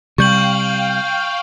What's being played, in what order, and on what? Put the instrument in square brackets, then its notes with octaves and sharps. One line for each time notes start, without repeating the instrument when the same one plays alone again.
[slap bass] C3 G3 [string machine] F5 G5 [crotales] C#6 G6 F#7